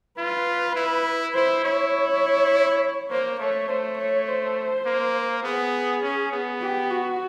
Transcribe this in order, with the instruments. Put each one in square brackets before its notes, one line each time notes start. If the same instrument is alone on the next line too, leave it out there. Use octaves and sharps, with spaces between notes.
[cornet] F4 [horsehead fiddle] B4
[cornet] E4
[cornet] E4 [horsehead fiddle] C5
[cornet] E4 [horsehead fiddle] C#5
[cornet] A#3 [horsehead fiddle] C5
[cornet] A3 [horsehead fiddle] C#5
[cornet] A3 [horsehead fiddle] C5
[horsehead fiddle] C#5
C5
[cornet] A#3
[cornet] B3 [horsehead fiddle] G#4
[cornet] C#4
B3
[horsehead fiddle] G4
F#4